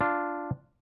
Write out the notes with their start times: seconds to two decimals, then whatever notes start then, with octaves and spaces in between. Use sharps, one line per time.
0.01 D4 F4